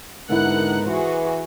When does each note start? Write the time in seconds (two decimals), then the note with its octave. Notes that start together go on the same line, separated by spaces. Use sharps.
0.30 G#2 D3 B3 D#4 E4 A#4 F#5 F#6
0.86 E3 F#4 G#4 C5